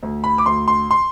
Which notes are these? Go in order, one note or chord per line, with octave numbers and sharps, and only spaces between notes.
D2
B5
D6
D2 C6
C6
C6